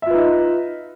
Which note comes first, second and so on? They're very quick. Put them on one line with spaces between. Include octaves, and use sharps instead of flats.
E5 F4 B4 D#4